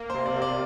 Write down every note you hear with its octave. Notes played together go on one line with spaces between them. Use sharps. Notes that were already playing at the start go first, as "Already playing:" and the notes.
Already playing: A#3
C5
C3
D5
C3
D5